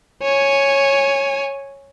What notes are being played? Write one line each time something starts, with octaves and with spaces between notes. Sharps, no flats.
C#5 G#5